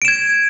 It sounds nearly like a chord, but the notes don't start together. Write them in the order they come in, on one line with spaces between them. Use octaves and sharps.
D7 E7 G#6